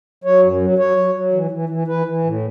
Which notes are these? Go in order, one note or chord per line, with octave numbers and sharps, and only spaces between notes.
F#3 C#5
F#2
F#3
F#3 C#5
F#3
F#3
E3
E3
E3
E3 B4
E3
A2